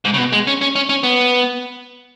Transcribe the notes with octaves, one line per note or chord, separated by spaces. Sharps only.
G#2
C#3
B2
G#3
C#4
C#4
C#4
C#4
B3